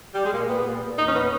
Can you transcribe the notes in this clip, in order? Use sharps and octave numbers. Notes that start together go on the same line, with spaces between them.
G3
G#3
A#2 A#3
A#2 B3
A#2
A#2
E2 D#4
C#4
D#3 B3